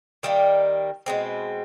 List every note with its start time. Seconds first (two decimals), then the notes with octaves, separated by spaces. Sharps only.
0.23 D#3 G3 A#3
1.06 B2 G#3 C4